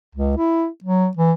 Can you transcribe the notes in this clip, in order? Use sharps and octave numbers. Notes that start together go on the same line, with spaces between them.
C#2
E4
F#3
E3